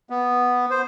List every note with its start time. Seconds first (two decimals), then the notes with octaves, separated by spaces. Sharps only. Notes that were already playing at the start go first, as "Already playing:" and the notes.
0.10 B3
0.70 C5